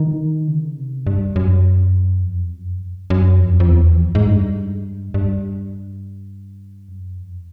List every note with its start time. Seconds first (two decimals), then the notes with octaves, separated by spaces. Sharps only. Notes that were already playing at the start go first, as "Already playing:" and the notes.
Already playing: D#3
0.48 C#3
0.78 C3
1.07 G2
1.36 F#2
2.23 F2
2.51 F#2
3.10 F#2
3.39 F2
3.60 F2
3.68 E2
3.98 F2
4.15 G#2
4.26 G2
5.14 G2
6.89 F#2
7.18 F2